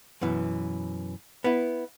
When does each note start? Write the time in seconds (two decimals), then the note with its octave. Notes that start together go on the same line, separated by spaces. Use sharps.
0.22 F#2 B2 E3
1.44 B3 E4